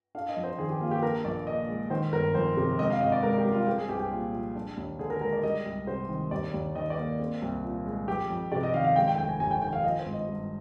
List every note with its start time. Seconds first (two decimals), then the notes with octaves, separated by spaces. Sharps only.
0.15 D4 F5
0.29 D#5
0.37 F2
0.44 C5
0.59 D#3 G#4
0.70 G4
0.81 A#3 F4
0.91 G4
1.03 D4 A#4
1.25 A#1 D5
1.47 A#2 D#5
1.69 G#3
1.90 D#3 C5
2.12 G1 A#4
2.34 F2 C5
2.57 C3
2.79 G#1 D#5
2.90 F5
3.00 G#1 D#5
3.12 D5
3.23 G#2 A#4
3.38 G4
3.45 G3
3.52 F4
3.67 C4 G4
3.78 G#4
3.89 C2 G4
4.00 G4
4.12 A#2
4.33 F3
4.56 D4
4.77 D#2
4.99 D3 G#4
5.10 A#4
5.21 G#3 A#4
5.33 D5
5.43 G3 D#5
5.65 C2
5.87 C3 C5
6.09 D#3
6.31 D#2 D5
6.54 D#2
6.75 D#3 D#5
6.90 D5
6.97 A#3
7.19 C4
7.42 C2
7.64 A#2
7.86 G#3
8.08 F2 G4
8.30 F2
8.52 C3 D5
8.63 D#5
8.74 D#3 F5
8.85 F5
8.95 G#3 G5
9.08 G5
9.18 F1 G5
9.29 G#5
9.40 D#2 G#5
9.51 G5
9.62 D#3 G5
9.73 F5
9.84 F3 D#5
9.99 C5
10.06 G#1
10.14 D#5
10.28 G2